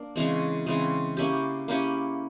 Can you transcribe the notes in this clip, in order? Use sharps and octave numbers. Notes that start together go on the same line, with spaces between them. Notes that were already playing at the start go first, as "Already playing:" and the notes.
Already playing: A#3 D4
C#3 E3 G#3 C4
C#3 E3 G#3 C4
A#3 C#4 E4 G4
A#3 C#4 E4 G4